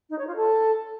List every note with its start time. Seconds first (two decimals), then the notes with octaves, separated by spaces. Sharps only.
0.10 D#4
0.19 C#5
0.27 F4
0.36 A4